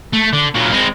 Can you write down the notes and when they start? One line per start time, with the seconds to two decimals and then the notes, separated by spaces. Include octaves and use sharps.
0.13 A3
0.33 D3
0.54 A#2 F#3
0.71 G#3 C4